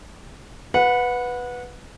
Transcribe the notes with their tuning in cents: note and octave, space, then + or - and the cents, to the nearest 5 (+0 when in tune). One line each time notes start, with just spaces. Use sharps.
B4 +0 F#5 -25